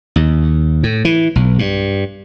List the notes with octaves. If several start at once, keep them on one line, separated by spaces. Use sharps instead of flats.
D#2
A2
E3
B1
G2